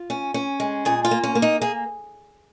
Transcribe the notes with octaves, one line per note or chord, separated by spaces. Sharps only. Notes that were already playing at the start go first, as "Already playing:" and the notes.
Already playing: F4
C#4
C#4
G#3
A#2 G#4
F4
A#3
C#4
A#3
D#4
A#3 G#4